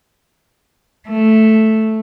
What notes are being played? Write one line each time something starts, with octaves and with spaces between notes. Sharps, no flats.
A3